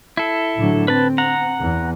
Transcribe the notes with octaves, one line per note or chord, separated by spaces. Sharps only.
E4 A4
A2 D3 F#3
C4 B4 A5
F#5 A#5
E2